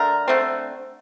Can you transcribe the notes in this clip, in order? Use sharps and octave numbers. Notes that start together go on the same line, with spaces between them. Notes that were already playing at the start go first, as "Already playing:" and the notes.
Already playing: D3 A3 A#4
D3 A3 C4